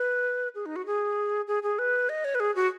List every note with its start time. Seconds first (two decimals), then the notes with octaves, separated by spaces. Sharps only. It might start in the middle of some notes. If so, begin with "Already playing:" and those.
Already playing: B4
0.55 G#4
0.66 D#4
0.76 F#4
0.86 G#4
1.48 G#4
1.63 G#4
1.79 B4
2.09 D#5
2.25 C#5
2.35 B4
2.40 G#4
2.55 F#4